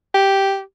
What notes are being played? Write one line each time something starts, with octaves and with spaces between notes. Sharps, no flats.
G4